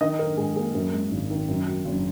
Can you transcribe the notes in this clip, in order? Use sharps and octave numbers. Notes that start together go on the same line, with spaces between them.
D#3 D#5
D#4 A#4
G#2 G#4
A#3 G#4
F#2 A#4
G#3
G#1
D#3
F#2
F#3
F#1